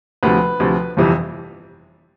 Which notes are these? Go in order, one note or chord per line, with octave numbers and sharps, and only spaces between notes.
D2 C3 F3 B4
D2 C3 F3
G1 F2 C3 E3